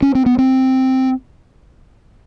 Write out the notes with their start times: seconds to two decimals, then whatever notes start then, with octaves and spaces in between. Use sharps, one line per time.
0.02 C#4
0.15 C4
0.26 B3
0.38 C4